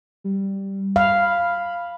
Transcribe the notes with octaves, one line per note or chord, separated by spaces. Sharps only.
G3
F5 B5